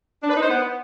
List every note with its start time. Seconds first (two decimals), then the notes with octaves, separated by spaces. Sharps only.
0.23 D4
0.30 B4
0.36 D#4
0.42 C5
0.49 B3